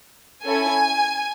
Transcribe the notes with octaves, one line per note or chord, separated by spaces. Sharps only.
C#4 E4 A4 G#5